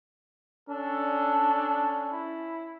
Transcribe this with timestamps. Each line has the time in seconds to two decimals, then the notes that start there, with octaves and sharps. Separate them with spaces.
0.69 C#4 D4 A4
2.11 E4